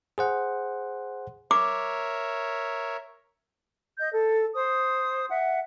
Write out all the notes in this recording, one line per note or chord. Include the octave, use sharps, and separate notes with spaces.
G#4 C5 F#5
A#4 C#5 E5 D6
D#5 G6
A4
C5 D#6
E5 F#5